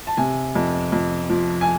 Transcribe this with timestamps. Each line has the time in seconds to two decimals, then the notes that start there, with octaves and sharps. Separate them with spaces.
0.07 A5
0.17 C3 G#5
0.55 F2
0.92 F2
1.30 F3
1.61 G#5